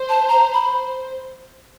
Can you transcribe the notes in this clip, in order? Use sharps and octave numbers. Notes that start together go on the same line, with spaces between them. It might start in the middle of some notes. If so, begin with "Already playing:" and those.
Already playing: C5
A5
A#5
B5